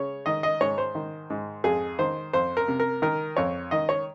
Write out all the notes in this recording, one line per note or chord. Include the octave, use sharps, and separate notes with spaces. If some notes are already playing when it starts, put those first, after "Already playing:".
Already playing: C#3 C#5
D#3 D#5
D#5
G#2 C#5
C5
D#3
G#2
F2 G#4
D#3 C5
F2 C5
A#4
C3
A#4
D#3 A#4
F2 C#5
D#3 D#5
C#5